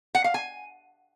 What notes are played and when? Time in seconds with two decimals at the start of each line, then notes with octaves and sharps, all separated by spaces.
0.15 F#5
0.24 F5
0.34 G#5